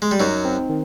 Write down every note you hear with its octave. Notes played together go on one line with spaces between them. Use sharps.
G#3
G3
F#2 F#3 D#4
C4
D#3